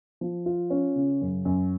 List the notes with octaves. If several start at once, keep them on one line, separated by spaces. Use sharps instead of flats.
F3
F4
C#4
C#3
F#2
F#2